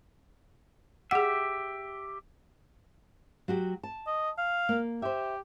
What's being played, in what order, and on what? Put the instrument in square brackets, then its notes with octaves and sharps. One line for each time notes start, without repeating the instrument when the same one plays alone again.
[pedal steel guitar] G4 E5 [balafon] G#4 F#5
[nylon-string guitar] F#3 F#4 G4
A5
[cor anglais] D#5
F5
[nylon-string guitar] A#3
[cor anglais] G4 [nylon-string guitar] C5 E5